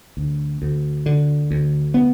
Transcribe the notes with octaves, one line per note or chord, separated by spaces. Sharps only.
D2
D2
D3
D2
B3